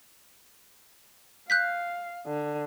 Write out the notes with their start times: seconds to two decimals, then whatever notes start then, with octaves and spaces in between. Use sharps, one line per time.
1.50 F5 F#6 G6 B6
2.27 D3